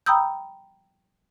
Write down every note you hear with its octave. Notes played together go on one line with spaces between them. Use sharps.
G5 A#5 B5 D#6 E6 G6